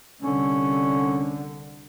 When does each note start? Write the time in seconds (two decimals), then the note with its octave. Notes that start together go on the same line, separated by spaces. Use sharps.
0.21 C2 D3 C#4